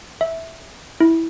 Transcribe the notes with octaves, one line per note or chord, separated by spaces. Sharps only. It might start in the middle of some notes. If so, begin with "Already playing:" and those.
E5
E4